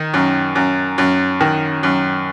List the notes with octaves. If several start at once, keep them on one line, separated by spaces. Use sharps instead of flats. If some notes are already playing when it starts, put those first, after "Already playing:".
Already playing: D#3 D#4
F#2
F#2
F#2
D#3
F#2